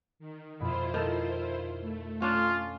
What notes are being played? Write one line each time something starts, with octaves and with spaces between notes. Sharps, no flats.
D#3
F2 B2 E4 F4 C5 B5
D#3 A4
A3
C#4 D4 F4